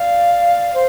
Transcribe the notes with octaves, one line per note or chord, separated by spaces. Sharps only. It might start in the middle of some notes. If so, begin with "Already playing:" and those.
Already playing: D5 F5
C5